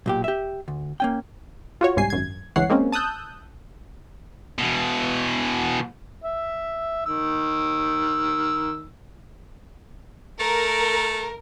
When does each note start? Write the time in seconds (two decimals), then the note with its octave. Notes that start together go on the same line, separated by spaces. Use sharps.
0.06 B1 A#2 G4
0.24 G4 E5
0.68 D2
1.00 A#3 C#4 G5
1.81 F4 F#4 C#5
1.97 G1 C2 G#2 G3 G#5 C7
2.10 G#1 F#2 G#6
2.56 G1 C#2 E3 C#5 F#5 C7
2.69 G#3 A#3 C4 C#4
2.92 A5 D#6 E6 F#6 G6
4.58 B2 E3
6.24 E5
7.06 D#3 E6
10.40 A3 A#4